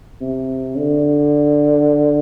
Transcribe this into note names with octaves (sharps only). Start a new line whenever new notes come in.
C3
D3